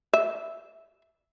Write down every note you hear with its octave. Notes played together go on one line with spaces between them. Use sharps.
E5